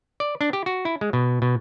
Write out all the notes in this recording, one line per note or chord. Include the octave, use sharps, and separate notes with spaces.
D5
D4
G4
F#4
E4
G#3
B2
B2